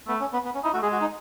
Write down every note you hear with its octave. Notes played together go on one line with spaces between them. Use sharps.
A3 B3
C#4
B3
B3
C#4
D#4 E4
A3 F#4
G#3 G#4
F#4
D#4